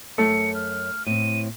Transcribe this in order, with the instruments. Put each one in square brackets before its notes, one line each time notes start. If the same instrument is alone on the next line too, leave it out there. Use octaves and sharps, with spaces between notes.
[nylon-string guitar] F#2 [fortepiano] A3 [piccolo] C#7
[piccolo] F6
[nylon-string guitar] A2 C4 [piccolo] D#7